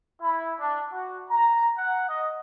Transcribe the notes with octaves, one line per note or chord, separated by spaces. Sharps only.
E4
D4
F#4
A#5
F#5
D#5